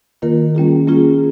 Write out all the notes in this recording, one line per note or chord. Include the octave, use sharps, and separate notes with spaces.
D#3 A#3 F4 A#4
G3 A#3 C#4 F4 G#4
G3 A#3 C#4 F4 G#4